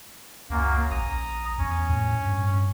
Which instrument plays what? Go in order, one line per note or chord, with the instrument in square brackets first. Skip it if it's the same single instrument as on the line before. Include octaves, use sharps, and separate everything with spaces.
[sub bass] C#2 [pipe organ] F#2 A#3
[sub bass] A#1 [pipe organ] A#5 D#6
[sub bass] E2 [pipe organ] C#4
[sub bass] A2
G2